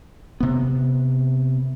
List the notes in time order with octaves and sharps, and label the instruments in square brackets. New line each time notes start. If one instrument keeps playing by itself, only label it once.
[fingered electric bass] C3 B3